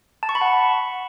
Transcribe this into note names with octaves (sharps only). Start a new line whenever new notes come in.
A5
C#6
B5
F#5